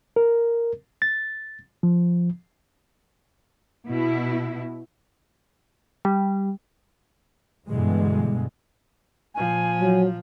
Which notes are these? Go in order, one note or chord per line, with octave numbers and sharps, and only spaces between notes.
A#4
A6
F3
B2 E4
G3
G2 B2 D3 E3 G3 G#3
A#2 F3 G#5
F#3